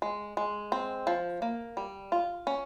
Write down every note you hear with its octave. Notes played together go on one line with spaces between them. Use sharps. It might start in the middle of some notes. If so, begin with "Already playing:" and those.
G#3
G#3
C4
F3
A#3
G3
F4
C#4